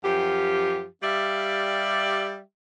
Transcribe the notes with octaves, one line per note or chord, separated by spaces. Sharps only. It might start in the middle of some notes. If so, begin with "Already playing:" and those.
F#2 F3 G4
G3 G4 D5 E5 F5